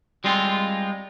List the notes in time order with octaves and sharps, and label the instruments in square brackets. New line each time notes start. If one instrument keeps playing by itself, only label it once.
[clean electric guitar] G3 G#3 C4 F4